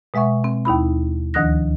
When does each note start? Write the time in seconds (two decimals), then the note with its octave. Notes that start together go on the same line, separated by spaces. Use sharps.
0.14 B2 G#3 E5 F#5 C#6
0.44 C4
0.65 D#2 D#4 E4 B5
1.34 D2 D#3 F3 D#6 F#6 A#6